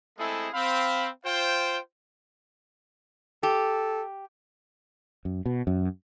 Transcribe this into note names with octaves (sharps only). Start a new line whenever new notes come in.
G#3 A3 C4 E4 G#4 A4
C4 F5 B5
F4 C5 G5
G4 A4
F#2
B2
F#2